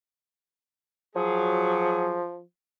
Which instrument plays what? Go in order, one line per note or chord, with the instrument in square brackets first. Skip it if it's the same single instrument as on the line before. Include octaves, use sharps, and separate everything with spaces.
[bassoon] F3 [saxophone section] F#3 G#4